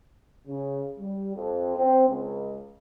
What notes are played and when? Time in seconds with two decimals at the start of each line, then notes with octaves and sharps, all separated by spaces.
0.47 C#3
0.99 G3
1.36 F2
1.77 C4
2.09 C#2